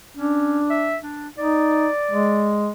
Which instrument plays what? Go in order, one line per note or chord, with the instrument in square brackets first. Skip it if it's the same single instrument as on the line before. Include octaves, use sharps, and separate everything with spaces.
[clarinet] C#4 [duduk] D4
[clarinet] E5
D4
[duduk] D#4 [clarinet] D5
[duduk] G#3